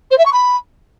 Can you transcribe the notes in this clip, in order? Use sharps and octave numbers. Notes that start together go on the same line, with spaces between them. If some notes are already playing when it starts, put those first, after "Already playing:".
C5
E5
C#6
B5